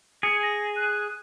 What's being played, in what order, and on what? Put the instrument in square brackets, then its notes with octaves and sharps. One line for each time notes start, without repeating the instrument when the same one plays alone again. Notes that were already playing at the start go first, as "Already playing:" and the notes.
[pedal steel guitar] G#4 [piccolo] C#7
[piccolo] A#6
F#6